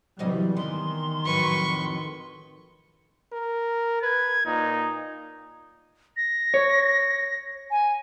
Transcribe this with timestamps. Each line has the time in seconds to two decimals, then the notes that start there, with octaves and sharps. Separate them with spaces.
0.19 C3 E3 F#3 G3 C5 D#5
0.57 D#3 E3 B3 C6
1.25 F2 A2 F#3 B4 C#6
3.33 A#4
4.03 B4 G#6
4.46 A#2 D#4
6.17 A#6
6.54 C#5
7.71 G#5